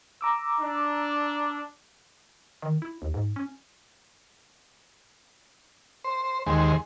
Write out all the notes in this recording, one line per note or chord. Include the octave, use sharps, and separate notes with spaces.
A#5 D6 E6
D4
D#3
E4
D#2
G#2
C#4
C5
D#2 G#3 C5